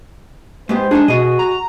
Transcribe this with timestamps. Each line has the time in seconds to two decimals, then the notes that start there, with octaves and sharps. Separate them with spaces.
0.69 G#2 B3 G4 C5
0.91 G#3 D4 D#4 G#4
1.08 B2 F#4 G#4 D#5
1.39 A#5